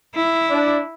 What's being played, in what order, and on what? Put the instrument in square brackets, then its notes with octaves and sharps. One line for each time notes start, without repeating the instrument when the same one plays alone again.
[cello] E4
[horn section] D4